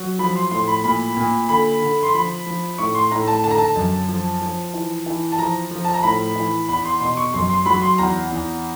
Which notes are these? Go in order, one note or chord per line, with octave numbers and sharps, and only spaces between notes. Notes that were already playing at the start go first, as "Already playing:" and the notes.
Already playing: F#3
F3 B5
C6
A2 C6
B5
A#2 B5
A#2
D3 B5
D3
C6
F3 B5
F3
A2 C#6
C6
A2 A#5
A5
D3 A5
A#5
A5
F#2
F3
F3
E3
E3
A5
F3 A#5
F3
A5
A#5
A2 B5
E3
E2 B5
C6
B2 C6
C#6
F#2 C6
C6
F#3 B5
C6
E2 A#5
E2